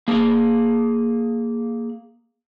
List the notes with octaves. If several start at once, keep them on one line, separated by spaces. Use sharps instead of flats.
A#3 G#4